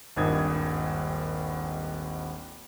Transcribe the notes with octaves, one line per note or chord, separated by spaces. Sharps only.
D#1 G#1 G2 D#3 D#6 G#6